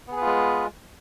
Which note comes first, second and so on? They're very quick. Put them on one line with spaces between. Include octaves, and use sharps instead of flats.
B3 G#4 B4 F4 G#3